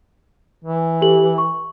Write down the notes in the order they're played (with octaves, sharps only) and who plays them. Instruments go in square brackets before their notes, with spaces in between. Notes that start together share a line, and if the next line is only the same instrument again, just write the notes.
[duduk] E3
[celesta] G4 A4 F#7
C#6